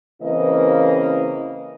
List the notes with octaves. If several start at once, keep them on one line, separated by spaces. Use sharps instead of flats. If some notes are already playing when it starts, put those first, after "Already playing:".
C#3 E3 A#3 C4 B4 D#5